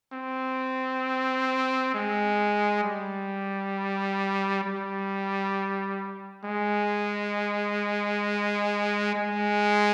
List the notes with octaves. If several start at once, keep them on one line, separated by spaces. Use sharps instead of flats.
C4
G#3
G3
G3
G#3
G#3